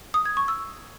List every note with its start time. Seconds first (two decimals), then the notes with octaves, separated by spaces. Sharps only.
0.14 D#6
0.25 G#6
0.37 C#6
0.48 E6